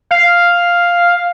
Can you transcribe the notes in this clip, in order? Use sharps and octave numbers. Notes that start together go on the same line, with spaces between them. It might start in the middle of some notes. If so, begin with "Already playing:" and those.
F5